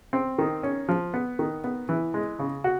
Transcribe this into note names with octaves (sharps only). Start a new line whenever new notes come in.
C4
D#3
C#4
F3
B3
D#3
B3
E3
G#3
C#3
F#4